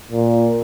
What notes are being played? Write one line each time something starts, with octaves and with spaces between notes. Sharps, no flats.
A#2